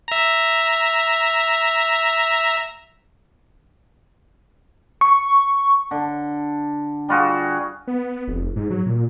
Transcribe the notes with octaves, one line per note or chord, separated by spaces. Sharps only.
E5 A#5
C#6
D3
G3 F4 F#4 G#4
B3
F1
G#2
F#3
A#2